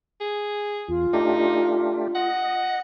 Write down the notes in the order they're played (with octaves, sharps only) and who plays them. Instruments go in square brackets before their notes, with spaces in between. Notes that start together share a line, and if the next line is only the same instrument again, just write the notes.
[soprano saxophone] G#4
[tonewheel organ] E2 [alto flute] F4
[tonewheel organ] A3 D4 G4 [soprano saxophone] D#4
[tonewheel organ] D#5 [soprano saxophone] F#5